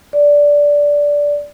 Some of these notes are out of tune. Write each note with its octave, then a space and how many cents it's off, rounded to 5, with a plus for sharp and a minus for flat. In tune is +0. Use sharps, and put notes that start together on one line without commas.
D5 -10